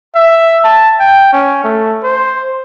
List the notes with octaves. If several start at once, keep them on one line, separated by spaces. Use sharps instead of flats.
E5
A5
G5
C#4
A3
C5